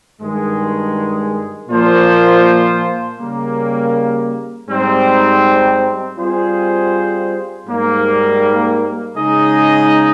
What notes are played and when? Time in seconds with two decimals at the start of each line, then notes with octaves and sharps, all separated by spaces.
0.19 G2 D#3 G#3
1.69 A#2 F3 A#3 F4 C5
3.18 C#3 G3 A#3
4.68 G#2 G3 C4 D#4
6.17 G3 C4 F4 G#4 C5
7.67 G#2 G3 A#3 D#4
9.16 C#3 G#3 D#4 G#4 D#5